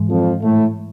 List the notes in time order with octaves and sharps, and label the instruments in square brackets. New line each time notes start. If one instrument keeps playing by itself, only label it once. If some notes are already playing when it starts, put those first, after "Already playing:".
Already playing: [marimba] G#2 E3 G#3
[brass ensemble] F2 F3
A2 A3